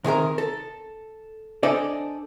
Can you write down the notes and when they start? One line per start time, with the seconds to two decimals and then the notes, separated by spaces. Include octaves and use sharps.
0.04 C3 D#3 G#4 A#4
0.38 A4
1.63 D4 A4 C5 D5 D#5 G#5